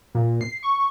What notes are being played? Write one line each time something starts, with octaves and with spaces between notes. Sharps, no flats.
A#2
C7
C#6